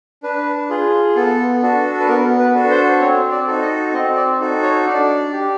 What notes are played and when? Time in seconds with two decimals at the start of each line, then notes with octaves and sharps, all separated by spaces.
0.23 D4 B4
0.69 F4 G#4
1.16 B3 A4
1.62 D4 F#4 A4
2.00 B4
2.08 B3 A#4
2.39 B4
2.54 D4 F#4 A4
2.70 C5
3.01 C4 C#5
3.31 D5
3.47 D#4 F#4 A4
3.62 D#5
3.93 C4 D#5
4.16 D5
4.40 D#4 F#4 A4
4.63 C#5
4.86 D4 D5
5.32 G4